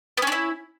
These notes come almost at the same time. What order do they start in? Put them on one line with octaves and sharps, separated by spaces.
B3 C#4 D4 E4